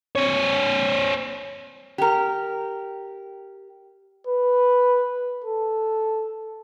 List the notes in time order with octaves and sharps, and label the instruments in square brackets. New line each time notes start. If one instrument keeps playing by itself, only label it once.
[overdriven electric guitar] C4 C#5
[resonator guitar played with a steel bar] G4 A#4
[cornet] B4
A4